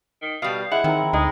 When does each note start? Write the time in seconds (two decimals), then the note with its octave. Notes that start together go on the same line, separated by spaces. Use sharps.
0.22 D#3
0.42 B2 G3 F5
0.72 G#3 E4 F#5
0.84 D#3 C4 A#4
1.13 D2 G#3 D#4